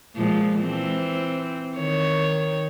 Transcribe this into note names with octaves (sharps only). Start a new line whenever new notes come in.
A#2 F3 G#3
E3 C4
D#3 C#5